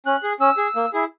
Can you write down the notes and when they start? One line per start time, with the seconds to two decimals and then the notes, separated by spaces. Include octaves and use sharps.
0.06 C#4 F#6
0.23 G#4
0.40 C#4 E6
0.57 G#4
0.76 A#3
0.93 E4 G#4